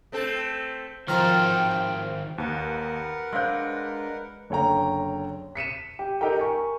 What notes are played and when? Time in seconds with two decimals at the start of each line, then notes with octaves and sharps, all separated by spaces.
0.12 A3 C4 A4
1.08 D#3 F3 C4 A#4 G5 A5 F6
2.38 D#2 A#4 B4 F#5
3.33 G#3 D4 C5 F5 C6 E6 G6
4.50 F#1 D3 C#5 G5 A#5
5.55 B6 C#7 D#7 E7
5.99 G4
6.21 D#4 G4 A4 A#4 G5
6.38 A#4 G#5 C#6